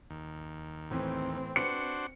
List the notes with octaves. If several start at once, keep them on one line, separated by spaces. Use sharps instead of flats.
D#2
A2 E3 C4
D4 F#4 B4 C5 C#7